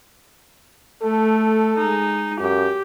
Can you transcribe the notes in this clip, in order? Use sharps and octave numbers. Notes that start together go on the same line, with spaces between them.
A3 A4
G#3 D#4
F#2 G4